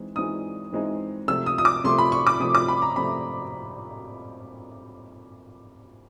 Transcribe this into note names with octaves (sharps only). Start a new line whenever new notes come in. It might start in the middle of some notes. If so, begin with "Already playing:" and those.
Already playing: E3 G#3 C4 D#4
E3 G#3 C4 D#4 D#6
E3 G#3 C4 D#4
C3 F3 A3 E6
D#6
D#6
D6
C3 F3 A3 C6
B5
C#6
D6
C3 F3 A3 D#6
D6
B5
A#5
C3 F3 A3 B5